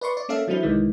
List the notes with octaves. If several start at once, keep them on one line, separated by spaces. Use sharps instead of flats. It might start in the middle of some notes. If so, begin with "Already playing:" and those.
B4 D5 C6 C#6
D5
A#3 C#4 A4 E5 F5
E3 F#3 A3 C4 D4 E4
C2 D#3 E3 G#3